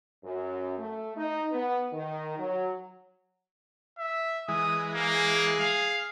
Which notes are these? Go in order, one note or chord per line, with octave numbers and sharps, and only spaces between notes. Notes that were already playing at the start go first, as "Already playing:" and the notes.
F#2
A3
D#4
B3
D#3
F#3
E5
E3 G#3 D#6
A#3 G#4
F5